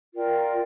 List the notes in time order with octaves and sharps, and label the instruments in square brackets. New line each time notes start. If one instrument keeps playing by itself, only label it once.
[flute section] F4 A#4 D5 G5